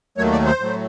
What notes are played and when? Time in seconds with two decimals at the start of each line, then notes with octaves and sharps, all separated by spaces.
0.17 D#2 D#3 F#3 A3 C#5
0.32 D5
0.46 C5
0.60 A2 F#3 A3